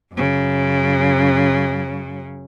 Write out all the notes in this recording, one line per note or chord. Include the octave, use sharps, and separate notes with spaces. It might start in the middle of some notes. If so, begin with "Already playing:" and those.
F#2 C#3